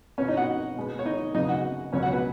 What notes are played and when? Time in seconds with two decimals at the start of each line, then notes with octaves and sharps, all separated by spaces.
0.18 B2 B3 C#4 C#5
0.28 D#4 D#5
0.37 F#4 F#5
0.76 B2 G#3 B3
0.99 C#5
1.06 D#4 D#5
1.34 F#2 C#3 F#3 B3 D#4 D#5
1.49 F#4 F#5
1.92 C#2 B2 F#3 B3 C#4 C#5
2.03 F#4 F#5
2.13 B4